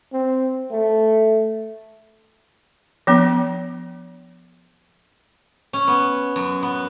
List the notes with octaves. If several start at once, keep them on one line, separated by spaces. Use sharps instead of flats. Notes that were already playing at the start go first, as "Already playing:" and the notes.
C4
A3
F3 B3 D4
C#4
B3
F#2
B3